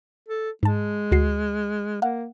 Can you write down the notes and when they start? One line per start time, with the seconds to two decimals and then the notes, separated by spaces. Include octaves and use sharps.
0.28 A4
0.63 G#2 G#3 A5
1.11 D2 F#4 C7
2.02 A#3 F5 F#5